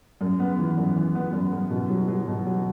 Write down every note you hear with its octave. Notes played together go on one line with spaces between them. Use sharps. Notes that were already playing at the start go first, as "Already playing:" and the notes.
F#2
B3
E3
F#2
E3
B3
F#2
F#2
B2
F#3
F#3
B2
F#3